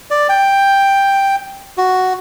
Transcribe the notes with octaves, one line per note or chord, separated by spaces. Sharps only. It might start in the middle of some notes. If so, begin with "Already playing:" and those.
D5
G5
F#4